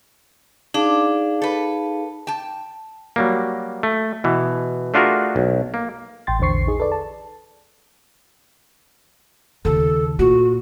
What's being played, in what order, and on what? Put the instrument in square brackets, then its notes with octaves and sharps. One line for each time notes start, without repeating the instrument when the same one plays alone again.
[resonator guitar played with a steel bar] D4 [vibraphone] D#4 G#4 F5
[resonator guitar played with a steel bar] A4 B4
G5 A5
[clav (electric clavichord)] F#3 G3 A#3
A3
B2 E3
A3 D4 F4 F#4 G#4 A#4
B1
A#3
[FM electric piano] A1 G5 C6 A6
A#1 E2 D3 C5 C#6 C7
D#4 G#4
A4 B4 D5
A5
[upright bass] D#2 C#3 [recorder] A4
[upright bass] A#2 [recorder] F#4